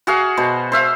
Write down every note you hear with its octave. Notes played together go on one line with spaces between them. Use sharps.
F#4 G#4 F5 F#5
B2 C5
C5 E5 F5